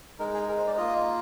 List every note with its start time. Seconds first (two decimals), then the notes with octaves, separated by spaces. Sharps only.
0.19 G#3 D#4 A#4
0.34 G#4
0.49 A#4
0.58 C5
0.67 D5
0.77 A#3 F4 D#5